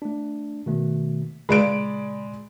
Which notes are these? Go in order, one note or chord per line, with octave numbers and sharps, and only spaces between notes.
A3 D4
B2 D#3 A3
A#2 C#3 G#3 D5 B5 D7